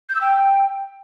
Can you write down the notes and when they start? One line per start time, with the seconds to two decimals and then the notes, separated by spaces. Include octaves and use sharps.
0.09 G6
0.15 E6
0.21 G5